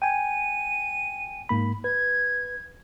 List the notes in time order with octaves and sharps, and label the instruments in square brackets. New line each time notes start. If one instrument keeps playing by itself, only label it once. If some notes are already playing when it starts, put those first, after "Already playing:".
[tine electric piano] G5 G#5 [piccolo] D#7
[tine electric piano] G#2 A#3 B5
[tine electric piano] B4 [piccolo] G#6